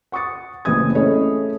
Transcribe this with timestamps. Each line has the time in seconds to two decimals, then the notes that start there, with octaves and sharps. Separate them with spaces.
0.12 F#5 C#6 D#6 A6 C#7
0.65 F#1 A2 E3 C4 D#6 G#6
0.95 A3 C#4 E4 G#4 C#5 D#5